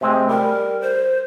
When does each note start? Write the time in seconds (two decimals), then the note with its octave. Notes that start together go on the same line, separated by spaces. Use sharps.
0.01 C3 G#3 A3 C4
0.29 G3 A#4
0.81 C5